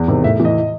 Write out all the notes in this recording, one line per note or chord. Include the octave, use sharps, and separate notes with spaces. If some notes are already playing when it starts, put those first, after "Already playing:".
Already playing: E2
C3 D#3
A2 E5
E3
D#5